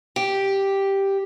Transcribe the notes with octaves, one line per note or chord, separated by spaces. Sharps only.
G4